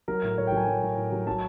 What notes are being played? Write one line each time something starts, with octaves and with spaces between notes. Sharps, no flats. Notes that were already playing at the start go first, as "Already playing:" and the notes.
F#3 A#4
A2
A2 C#5
G5
F#3 G#5
F#3
A2
A2
F#3
F#3 A5